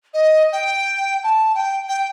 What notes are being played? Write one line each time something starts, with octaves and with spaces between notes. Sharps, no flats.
D#5
G5
A5
G5
G5